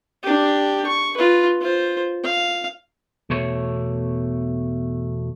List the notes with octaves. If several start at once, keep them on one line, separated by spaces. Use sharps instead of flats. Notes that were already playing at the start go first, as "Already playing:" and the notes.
D4 G4
C#6
F4 B4
F4 C5
F5
E2 B2 A3 C#5